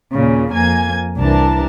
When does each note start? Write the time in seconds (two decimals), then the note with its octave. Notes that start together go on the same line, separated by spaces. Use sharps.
0.14 D#2 A#2 C#3
0.53 F2 A#3 G#5 G#6
1.18 C2 E3 D4 A#4 A5